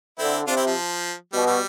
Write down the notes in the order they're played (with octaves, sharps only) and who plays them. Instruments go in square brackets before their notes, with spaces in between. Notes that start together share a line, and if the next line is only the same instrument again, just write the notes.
[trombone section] D3 [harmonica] C4 E4
[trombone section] C3 [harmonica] D4 F4
[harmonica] C4 E4
F3
[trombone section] B2 [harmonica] G3
[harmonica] G3